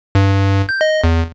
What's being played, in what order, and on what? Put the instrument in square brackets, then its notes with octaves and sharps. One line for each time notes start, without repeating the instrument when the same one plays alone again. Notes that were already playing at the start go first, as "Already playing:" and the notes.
[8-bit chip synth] G2
G6
D#5
E2